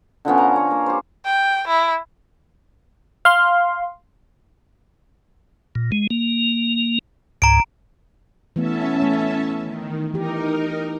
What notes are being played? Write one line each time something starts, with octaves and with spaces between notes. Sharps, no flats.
D3 F3 B3 C#4
A#5
C#5
A#3
G4 C5
G5
E4
F5 C6
A#2
G#3
A#3
C#2 G#2 A#5 D7
E3 A3 B3 C#4 E5 A5
A3
D#3
E3 D#4 G4 A#4